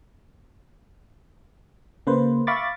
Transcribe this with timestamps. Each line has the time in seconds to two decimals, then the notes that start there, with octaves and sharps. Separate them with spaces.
2.07 C#3 A#3 B4 C5
2.47 E5 F5 B5 C#6 D6 A6